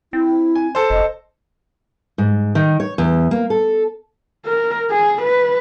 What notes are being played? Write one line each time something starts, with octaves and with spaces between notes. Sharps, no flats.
C4 E4
G#5
A4 C5
F1 D#5
G#2
D#3
C#5
E2
A#3
A4
A#4
G#4
B4